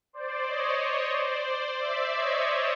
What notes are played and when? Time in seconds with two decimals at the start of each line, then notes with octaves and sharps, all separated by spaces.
0.13 C5 D5
0.47 C#5 D#5
1.14 C5 D5
1.81 D5 E5
2.15 C#5 D#5